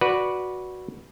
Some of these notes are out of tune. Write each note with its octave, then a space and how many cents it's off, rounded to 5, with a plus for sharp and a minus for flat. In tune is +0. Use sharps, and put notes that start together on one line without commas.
F#4 +0 B4 -10 D5 +0